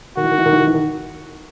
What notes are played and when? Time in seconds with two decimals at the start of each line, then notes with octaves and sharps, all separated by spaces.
0.17 D#3 F#4
0.24 E3
0.31 D#3
0.38 E3
0.46 D#3
0.53 E3
0.60 D#3
0.67 E3
0.74 D#3